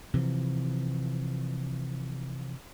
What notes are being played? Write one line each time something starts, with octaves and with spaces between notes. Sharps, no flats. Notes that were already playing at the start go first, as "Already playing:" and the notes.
C3 E3 F3